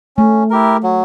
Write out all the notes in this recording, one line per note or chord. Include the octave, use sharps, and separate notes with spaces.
A3 C#4
E4 G4 A#4
F#3